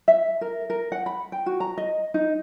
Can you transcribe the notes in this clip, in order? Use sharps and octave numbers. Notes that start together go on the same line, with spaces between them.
E5
A#4
A#4
F#5
B5
G5
F#4
A#5
D#5
D#4